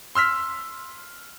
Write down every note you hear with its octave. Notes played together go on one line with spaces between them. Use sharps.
C6 E6 F6 B6